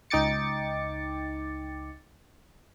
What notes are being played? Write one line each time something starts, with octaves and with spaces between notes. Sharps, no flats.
C#2 D#4 G5 D6 A6 C#7